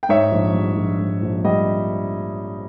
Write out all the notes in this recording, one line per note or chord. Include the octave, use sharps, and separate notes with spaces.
G5
G#2 C#5 E5
A#1
G3
A#1
G#2
A#1
G3 D#5